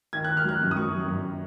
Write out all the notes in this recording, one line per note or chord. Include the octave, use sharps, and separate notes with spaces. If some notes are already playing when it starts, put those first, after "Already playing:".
D#3 G#6
D#3 F#6
F6
F#3 F#6
F#2
D#6
F#3 C#6
F#2
F#2